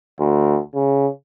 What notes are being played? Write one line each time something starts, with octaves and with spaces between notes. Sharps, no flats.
D2
C#3